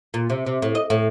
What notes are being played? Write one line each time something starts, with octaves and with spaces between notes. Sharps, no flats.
A#2
C3
C3
A2
D#5
A2